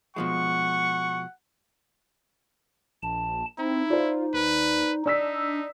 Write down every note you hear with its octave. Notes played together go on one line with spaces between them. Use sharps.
B2 F3 G#3 F#5 C#6
A#1 A5
C4 D#4 E4
F4 C5 D5
D#2 B4
D4 D#4 D5 E6 B6